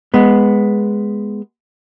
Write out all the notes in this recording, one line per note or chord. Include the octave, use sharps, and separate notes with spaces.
G#3 B3